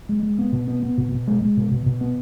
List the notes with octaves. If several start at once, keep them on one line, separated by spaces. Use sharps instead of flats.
G#3
G#3
B3
B2
B3
B3
B2
B2
G#3
G#3
B2
B2
B2
B3